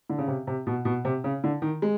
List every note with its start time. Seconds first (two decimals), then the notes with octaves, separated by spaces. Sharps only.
0.10 D3
0.18 C#3
0.28 C3
0.47 C3
0.67 B2
0.85 B2
1.05 C3
1.24 C#3
1.44 D3
1.62 D#3
1.82 G#3